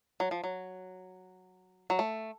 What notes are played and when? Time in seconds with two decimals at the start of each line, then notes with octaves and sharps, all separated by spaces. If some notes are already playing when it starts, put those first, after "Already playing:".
0.20 F#3
0.31 F3
0.44 F#3
1.90 F#3
1.99 A3